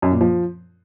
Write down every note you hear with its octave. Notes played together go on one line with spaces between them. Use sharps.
F#2
A#2
F3